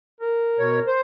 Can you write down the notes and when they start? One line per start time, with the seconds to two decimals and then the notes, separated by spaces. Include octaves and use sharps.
0.21 A#4
0.59 B2 C#5
0.87 C5